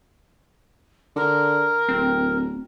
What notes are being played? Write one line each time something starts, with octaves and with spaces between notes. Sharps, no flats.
D3 A#4
D1 C4